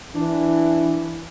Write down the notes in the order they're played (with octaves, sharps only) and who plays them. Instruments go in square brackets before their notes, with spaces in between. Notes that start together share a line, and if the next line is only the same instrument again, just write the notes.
[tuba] E3 [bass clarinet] D4